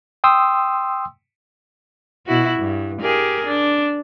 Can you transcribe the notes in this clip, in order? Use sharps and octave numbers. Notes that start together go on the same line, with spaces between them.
G5 C6 D#6 E6
B2 E4 F#4
G2
G4 G#4 A#4
D4